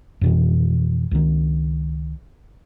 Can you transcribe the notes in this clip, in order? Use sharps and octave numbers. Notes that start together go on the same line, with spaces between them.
F2 B2 E3
C#2 D#3